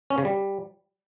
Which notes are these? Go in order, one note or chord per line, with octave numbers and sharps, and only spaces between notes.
C#4
C#3
G3